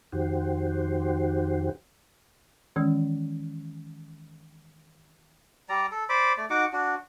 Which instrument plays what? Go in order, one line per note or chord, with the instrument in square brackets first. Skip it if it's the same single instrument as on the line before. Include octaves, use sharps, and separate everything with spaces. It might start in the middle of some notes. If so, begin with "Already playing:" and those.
[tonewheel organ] F2 D#3 F#4 G4 C5
[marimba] D#3 E3 G#3 C#4
[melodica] G3 D5 A#5
A4
C5 D5 B5 D6
A3 D5
D#4 F#4 F#5 D6
D4 F#4